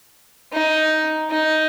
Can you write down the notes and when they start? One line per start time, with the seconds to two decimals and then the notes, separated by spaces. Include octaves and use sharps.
0.52 D#4
1.30 D#4